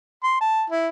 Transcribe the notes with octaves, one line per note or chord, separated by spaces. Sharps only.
C6
A5
E4